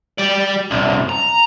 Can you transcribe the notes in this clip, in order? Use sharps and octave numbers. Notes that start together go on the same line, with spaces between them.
G3 D5
C2 F#2
A#5